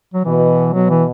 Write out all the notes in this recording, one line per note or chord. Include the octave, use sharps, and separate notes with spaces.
F#3
B2 E3
B2 F#3
E3